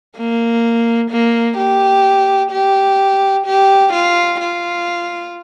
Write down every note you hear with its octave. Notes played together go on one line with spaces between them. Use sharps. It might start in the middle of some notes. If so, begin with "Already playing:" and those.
A#3
A#3
G4
G4
G4
F4
F4